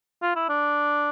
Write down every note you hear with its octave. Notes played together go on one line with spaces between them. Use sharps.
F4
E4
D4